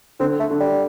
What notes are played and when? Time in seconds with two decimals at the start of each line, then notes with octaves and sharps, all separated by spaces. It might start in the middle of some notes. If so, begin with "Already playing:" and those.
0.20 D3 C4
0.40 A3
0.50 D3
0.60 G3